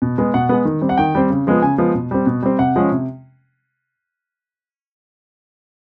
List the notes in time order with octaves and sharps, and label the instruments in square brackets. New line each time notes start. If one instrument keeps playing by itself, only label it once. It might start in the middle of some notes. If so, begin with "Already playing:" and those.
[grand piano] B2
G#3 B3
B2 F#5
G#3 B3
D#3
G3 C4
F#5
D#3 G5
G3 C4
C#3
F3 G#3 B3
C#3 G#5
F3 G#3 B3
B2
G3 C4
B2
G3 C4
C3 F#5
F3 G#3 C#4
C3